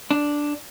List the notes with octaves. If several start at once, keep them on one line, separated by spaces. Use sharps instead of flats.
D4